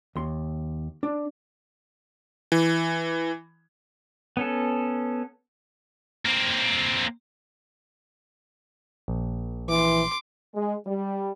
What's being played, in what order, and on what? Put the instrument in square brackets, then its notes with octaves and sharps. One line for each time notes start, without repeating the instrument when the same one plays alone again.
[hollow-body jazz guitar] D#2 C6
D4
[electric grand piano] E3
[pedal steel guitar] B3 C#4 A4
[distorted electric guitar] A#3 C4
[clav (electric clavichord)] A#1
[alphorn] E3 [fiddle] C6 D6
[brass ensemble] G#3
G3